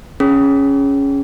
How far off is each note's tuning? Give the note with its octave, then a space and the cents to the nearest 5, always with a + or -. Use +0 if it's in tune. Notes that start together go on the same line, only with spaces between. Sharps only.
C#4 +0 G#4 +0